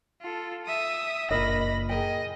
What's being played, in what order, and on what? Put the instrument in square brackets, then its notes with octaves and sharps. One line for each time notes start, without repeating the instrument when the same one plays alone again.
[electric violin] F4 A4
E5 D#6
[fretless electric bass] F#1 A#2 [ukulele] D4 A#4 D#5 [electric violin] B5 A#6
[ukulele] G#4 A#4 G5 [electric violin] D#5